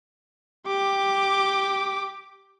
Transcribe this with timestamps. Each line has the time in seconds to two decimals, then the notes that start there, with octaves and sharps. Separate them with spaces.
0.67 G4 D6